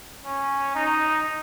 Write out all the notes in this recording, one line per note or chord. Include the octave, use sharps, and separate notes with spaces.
C#4
D#4